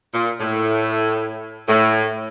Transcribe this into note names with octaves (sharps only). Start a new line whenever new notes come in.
A#2
A2
A2